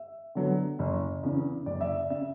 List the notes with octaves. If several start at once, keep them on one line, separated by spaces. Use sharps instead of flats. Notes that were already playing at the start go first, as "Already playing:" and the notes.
Already playing: E5
D3 F#3 B3
F#1
E2 C#3
F#1 D5
E5
D5
C#3 E5